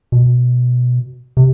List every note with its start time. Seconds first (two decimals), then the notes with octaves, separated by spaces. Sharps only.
0.12 B2
1.37 C3